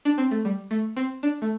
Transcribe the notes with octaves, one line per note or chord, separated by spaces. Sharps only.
D4
C4
A3
G3
A3
C4
D4
A3